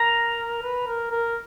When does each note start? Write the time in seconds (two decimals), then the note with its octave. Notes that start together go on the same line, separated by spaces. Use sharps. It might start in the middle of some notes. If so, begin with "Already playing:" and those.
Already playing: A#4 A#5
0.63 B4
0.87 A#4
1.11 A#4